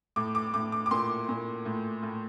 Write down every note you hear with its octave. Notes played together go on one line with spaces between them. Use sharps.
A2 D6
D6
A2 D6
D6
D6
A#2 C6
A#2
A2
A2